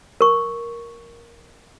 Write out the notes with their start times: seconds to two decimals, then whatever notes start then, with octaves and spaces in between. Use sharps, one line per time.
0.21 A#4 C#6